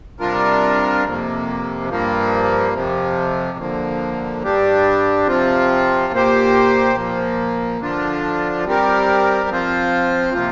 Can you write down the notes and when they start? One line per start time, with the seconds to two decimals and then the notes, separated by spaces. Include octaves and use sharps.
0.20 C3 G3 D4 F4 A#4
1.05 F2 C3 A#3
1.89 G2 F3 A#3
2.74 F2 C3 F3
3.58 D3 F3 A#3
4.42 G2 G3 D4 G4
5.27 C3 F3 C4 F4
6.12 A#2 A#3 G4 C5
6.95 A#2 F3 A#3
7.80 D3 F3 D4 F4
8.65 G3 C4 G4 A#4
9.49 F3 C4 F4 C5
10.34 C3 F3 A#3 F4